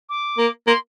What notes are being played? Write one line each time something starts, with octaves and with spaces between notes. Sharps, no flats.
D6
A#3
A#3 C6